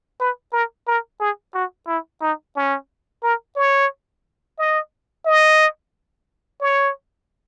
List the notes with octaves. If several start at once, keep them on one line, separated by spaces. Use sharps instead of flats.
B4
A#4
A#4
G#4
F#4
E4
D#4
C#4
A#4
C#5
D#5
D#5
C#5